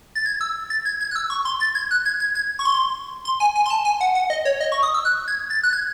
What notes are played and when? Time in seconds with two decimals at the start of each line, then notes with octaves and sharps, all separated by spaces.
0.15 A6
0.26 G#6
0.41 E6
0.70 A6
0.85 G#6
1.01 G#6
1.11 F#6
1.16 E6
1.30 C#6
1.45 C6
1.60 A6
1.75 G#6
1.91 F#6
2.05 G#6
2.20 G#6
2.35 G#6
2.59 C#6
2.65 C6
3.25 C6
3.40 G#5
3.56 G#5
3.66 C6
3.70 A5
3.85 G#5
4.01 F#5
4.15 F#5
4.30 D#5
4.45 C#5
4.60 D#5
4.72 C#6
4.83 D#6
4.94 E6
5.05 F#6
5.28 G#6
5.50 A6
5.63 F#6
5.73 G#6